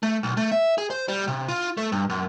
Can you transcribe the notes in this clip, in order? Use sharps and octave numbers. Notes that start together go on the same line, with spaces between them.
A3
B1
A3
E5
G#4
C5
G3
C3
F4
A3
G2
F#2